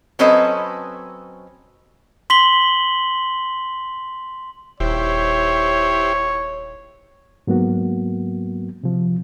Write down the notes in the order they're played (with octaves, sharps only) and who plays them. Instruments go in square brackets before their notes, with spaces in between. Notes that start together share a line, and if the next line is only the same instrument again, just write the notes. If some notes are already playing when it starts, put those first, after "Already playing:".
[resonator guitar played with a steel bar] F#3 C4 C#4 A4 B4 D#5
[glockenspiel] C6 B6 F#7 G7
[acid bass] D#1 [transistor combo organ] E4 G4 C5 [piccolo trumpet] C#5
[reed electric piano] G#2 F#3 A#3 B3 F#4
C3 F3